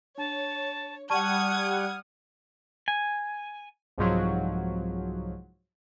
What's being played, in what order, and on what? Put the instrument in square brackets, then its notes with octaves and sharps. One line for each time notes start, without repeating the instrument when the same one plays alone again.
[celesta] D4 [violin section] C#5 [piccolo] A5
[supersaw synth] G3 F#5 [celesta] A5 C#6 D#7 [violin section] D#6 G#6 [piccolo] F6
[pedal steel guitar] G#5
[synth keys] C2 G#2 F3 F#3